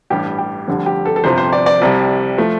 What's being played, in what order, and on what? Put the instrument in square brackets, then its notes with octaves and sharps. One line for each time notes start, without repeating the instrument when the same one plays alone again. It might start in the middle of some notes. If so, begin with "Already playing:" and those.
[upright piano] A1 G2 G3 G4
G4
F1 F2 D3 G3
G4
A4
A4
G1 F2 C3 F3 C5
C5
D5
D5
C2 C3 G3
F3 A3